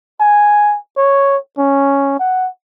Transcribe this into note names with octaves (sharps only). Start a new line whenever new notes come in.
G#5
C#5
C#4
F#5